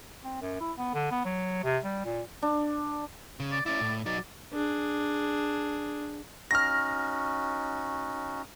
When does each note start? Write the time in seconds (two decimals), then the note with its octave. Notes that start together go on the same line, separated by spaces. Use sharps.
0.24 C4
0.41 F#2
0.60 E4
0.77 B3
0.94 D3
1.11 B3
1.25 F#3
1.64 C3
1.84 G3
2.05 A#2
2.42 D4
3.40 C#3
3.52 D5
3.66 C#4 E4 D5
3.80 A2
4.06 F#3 D#4 D5
4.53 D4 G#4
6.51 C#4 D#4 F#4 F6 A#6